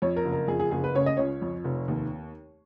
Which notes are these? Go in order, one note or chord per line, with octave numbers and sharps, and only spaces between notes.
F2 C#5
A#4
F#1
A#4
F2 G#4
G#4
F#1 G#4
B4
C#3 C#5
D#5
C#2 C#5
F2
F1
D#2